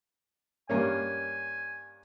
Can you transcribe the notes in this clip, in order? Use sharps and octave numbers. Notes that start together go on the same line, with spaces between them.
G2 A#3 C#4 G#5